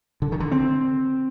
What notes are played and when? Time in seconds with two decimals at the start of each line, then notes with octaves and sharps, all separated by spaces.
0.22 D3
0.32 D#3
0.40 D3
0.51 C4